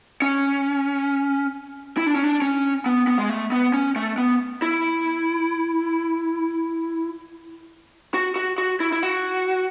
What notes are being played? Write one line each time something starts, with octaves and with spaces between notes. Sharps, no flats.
C#4
E4
D4
C#4
D4
C#4
B3
B3
G#3
A3
B3
C#4
A3
B3
E4
F#4
F#4
F#4
E4
E4
F#4